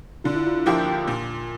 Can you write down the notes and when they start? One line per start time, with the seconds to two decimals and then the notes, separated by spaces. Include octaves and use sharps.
0.24 D3 F4
0.35 E4
0.47 F4
0.66 F3 A#3 E4 G4
1.07 A#2